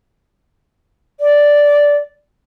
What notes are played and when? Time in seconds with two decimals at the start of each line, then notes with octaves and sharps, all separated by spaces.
1.20 D5